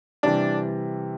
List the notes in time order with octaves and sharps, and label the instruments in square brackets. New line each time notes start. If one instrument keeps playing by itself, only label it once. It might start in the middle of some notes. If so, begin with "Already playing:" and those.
[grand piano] C3 E3 G3 [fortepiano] D4